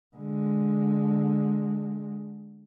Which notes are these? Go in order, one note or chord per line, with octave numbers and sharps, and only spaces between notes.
D3 G#3